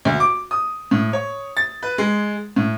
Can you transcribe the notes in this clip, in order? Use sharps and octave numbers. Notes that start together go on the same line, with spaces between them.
D2
D6
D#6
A2
C#5
A6
B4
G#3
A2